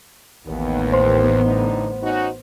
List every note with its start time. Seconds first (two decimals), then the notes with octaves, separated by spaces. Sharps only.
0.46 A1 D#2 B3
0.93 C5 C6
1.43 A2 D3 D#4
2.02 C#4 D#4 F#4